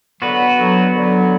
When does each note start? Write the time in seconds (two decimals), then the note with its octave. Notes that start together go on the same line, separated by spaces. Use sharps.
0.21 D3 F#3 B3 F#4 B4
0.59 D3 F#3
0.96 D3 F#3